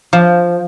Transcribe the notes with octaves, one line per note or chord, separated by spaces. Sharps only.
F3